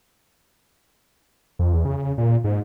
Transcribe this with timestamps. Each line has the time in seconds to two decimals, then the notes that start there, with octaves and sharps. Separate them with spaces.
1.59 F2
1.73 E2
1.85 C#3
2.18 A#2
2.44 G#2